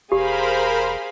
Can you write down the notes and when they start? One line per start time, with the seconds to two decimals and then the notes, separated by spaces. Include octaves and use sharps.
0.12 E1 G4 G#4 A#4 C5 F5 G#5 B5